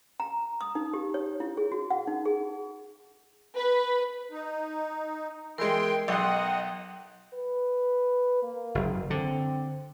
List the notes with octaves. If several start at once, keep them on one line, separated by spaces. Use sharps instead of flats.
A#5
D#6
D#4
G4
C#5
E4
G#4
F#4
F#5
D#4
G#4
B4
D#4
E3 G#3 A#4 G5 C6
B1 D#5 F#5 G5 C6
B4
A#3
F#1
D3 C4